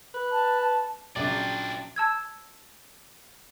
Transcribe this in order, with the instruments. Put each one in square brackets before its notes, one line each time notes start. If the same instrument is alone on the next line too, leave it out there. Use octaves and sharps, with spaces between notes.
[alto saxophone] B4
[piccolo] A5
A5
[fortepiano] A#1 C#3 F#3 [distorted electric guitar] D4 F4 [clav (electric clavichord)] D5 [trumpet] G5
[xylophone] A5 E6 G#6